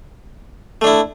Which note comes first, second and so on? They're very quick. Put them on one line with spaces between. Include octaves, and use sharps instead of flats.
A3 D4 E4